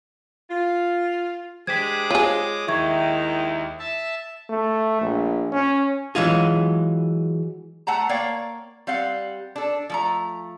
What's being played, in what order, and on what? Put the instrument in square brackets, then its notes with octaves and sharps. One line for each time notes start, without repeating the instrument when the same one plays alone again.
[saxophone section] F4
[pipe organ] G#3 D6 D#6 [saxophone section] D4 G4 C5 [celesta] G#6 B6
[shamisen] F4 G#4 [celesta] C#5 D#7
[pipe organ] D#2 [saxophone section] D#3 G#3 E4 [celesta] E5 C#6 G#6
[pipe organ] E5 A5
[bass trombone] A3
A#1
C#4
[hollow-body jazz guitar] E3 F#3 G#3 F4 G#4
[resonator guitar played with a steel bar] A3 F#5 A5 A#5
A#3 C#5 D5 F5 G5
G3 C4 F5 F#5
D4 A4
F3 A3 A#5